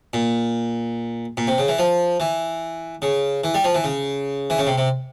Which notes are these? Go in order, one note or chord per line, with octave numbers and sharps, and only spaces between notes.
A#2
A#2
C3
C#3
E3
F3
E3
C#3
E3
G3
F3
E3
C#3
E3
C#3
C3
C3